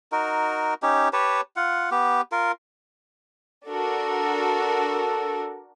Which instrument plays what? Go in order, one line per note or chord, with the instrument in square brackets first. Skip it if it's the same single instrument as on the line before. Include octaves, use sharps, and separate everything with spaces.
[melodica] D#4 F#4 A#4
C#4 D#4 G4
G4 B4 C#5 A5
F4 F#5
B3 G4
F4 A#4
[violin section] D4 F#4 A#4 [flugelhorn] A4